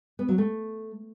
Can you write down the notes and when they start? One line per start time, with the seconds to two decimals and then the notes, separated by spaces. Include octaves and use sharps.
0.19 B3
0.29 F#3
0.38 A3